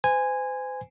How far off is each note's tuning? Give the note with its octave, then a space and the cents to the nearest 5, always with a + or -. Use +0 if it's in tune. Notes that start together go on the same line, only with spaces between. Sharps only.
C5 -40 G#5 -10